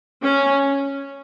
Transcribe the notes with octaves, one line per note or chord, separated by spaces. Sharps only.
C#4